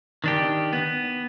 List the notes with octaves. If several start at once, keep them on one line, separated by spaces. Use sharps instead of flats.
D#3 D4 G4
B3